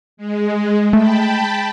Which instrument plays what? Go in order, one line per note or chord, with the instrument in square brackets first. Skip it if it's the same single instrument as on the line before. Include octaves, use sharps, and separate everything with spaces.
[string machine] G#3
[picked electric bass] A3 [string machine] G5 A5 B5